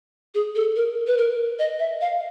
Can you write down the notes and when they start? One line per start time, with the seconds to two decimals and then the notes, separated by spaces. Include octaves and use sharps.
0.35 G#4
0.55 A4
0.76 A#4
1.07 B4
1.17 A#4
1.59 D#5
1.79 E5
2.01 F5